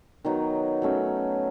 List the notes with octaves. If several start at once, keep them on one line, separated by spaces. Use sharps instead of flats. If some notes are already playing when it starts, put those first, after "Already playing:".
D#3 F#3 B3 D#4
F#3 A3 C#4